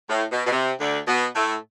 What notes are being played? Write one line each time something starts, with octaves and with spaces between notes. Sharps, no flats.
A2
B2
B2
C3
D2 D3
B2 B3
A2 A3